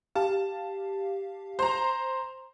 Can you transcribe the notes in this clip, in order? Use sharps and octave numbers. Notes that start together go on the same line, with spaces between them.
G4 F5 A5
C5 A#5